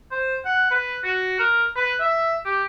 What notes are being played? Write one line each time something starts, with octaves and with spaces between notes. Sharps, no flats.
C5
F#5
B4
F#4
A#4
B4
E5
G4